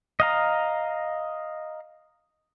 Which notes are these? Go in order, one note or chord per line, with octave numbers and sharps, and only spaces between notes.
D#5 F5 A#5